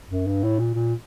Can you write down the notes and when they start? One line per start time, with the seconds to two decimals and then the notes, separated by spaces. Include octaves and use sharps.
0.10 F#2
0.26 G2
0.43 A2
0.59 A#2
0.74 A#2